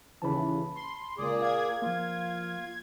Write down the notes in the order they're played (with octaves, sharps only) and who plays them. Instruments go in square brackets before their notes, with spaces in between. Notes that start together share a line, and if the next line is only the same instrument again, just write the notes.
[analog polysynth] D#2 C#3 E3 [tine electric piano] A5 B5
[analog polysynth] C6
[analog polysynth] C#2 [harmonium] A#2 G#4 D5
[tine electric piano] F5 [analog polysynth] G#6
[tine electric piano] F3 A#3 [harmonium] F4